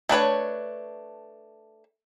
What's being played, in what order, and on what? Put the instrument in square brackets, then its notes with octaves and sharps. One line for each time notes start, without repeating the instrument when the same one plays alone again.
[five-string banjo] A3 D4 B4 C#5